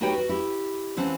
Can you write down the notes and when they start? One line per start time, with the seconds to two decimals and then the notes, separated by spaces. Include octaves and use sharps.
0.01 D#4 F#4 G4 B4 C#5 G5
0.18 F#4
0.29 E4 G4
0.97 C#3 E3 C4 C5 F#5 A5